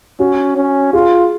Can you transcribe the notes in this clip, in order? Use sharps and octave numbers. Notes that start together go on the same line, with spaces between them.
C#4 F#4
C#4
F4 G#4